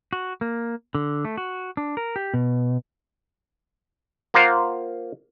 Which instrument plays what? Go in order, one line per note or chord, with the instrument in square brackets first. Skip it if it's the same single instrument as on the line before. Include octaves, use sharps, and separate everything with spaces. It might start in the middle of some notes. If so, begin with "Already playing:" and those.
[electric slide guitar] F#4
A#3
D3
A3
F#4
D4
A#4
G4
B2
[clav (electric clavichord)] A#3 F4 A#4 C5 F5 F#5